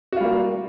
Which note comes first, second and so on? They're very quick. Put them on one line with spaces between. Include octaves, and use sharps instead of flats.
F#4 F4 G3 A#3